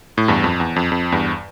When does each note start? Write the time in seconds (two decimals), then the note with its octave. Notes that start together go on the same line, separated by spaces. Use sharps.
0.18 A2
0.28 E2 G2
0.44 F2
0.60 E2
0.76 F2
0.92 F2
1.12 E2 G2